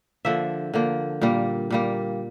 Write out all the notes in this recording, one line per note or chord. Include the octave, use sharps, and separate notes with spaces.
D3 F3 A#3 E5
D3 F3 A#3
A#2 G3 A#3
A#2 G3 A#3